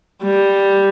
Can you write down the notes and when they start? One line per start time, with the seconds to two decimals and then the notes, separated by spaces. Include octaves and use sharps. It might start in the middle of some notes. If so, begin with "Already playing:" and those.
0.23 G3